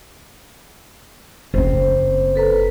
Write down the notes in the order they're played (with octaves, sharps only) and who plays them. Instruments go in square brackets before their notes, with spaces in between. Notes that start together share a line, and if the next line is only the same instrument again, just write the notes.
[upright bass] F#1 C4 [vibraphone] C5
[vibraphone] A4 B4 A#5